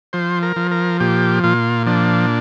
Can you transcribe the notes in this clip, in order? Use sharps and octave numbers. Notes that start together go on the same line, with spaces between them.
F3 C5
A#4
F3
A#4
A#2 G4
A#2 F4
F3 D4